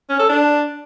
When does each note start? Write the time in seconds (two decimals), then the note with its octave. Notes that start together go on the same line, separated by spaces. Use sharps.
0.09 C#4
0.19 A4
0.30 D4